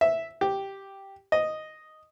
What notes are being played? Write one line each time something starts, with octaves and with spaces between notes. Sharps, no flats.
E5
G4
D#5